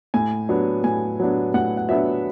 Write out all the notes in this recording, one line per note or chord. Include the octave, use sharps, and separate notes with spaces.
A2 G#5
F#3 B3 D4
A2 G#5
F#3 B3 D4
A2 F#5
F#5
F#3 B3 D4 E5